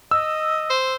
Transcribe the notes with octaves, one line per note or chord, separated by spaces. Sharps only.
D#5 E6
C5